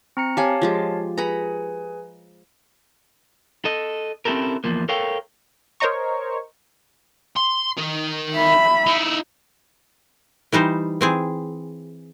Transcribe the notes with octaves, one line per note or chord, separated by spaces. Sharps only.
C4 A#5 C#7
G4 C#5 F5 G#5 A5
F3 G#3 G4
G#4 B4 G#5 A#5 B5
A4 D#5
C4 C#4 E4 G4 A4 A#4
E2 F3 A#3
A4 A#4 C#5 F5 G5
A#4 C5 C#5 D#5 A#5 C#6
C6
D#4 A#4
E5 B5
D#4 E4
E3 G3 D#4 C5
E3 C4 G#4